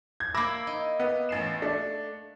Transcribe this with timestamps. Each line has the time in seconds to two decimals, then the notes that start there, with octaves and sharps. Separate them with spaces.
0.20 G#6
0.34 A#3 E4 B5 D6 E6 A#6
0.67 D#4
1.00 B3
1.29 A1 C7 E7
1.62 A3 D4